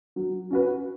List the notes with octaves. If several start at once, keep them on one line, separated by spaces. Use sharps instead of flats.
F#3
C#4 F#4 B4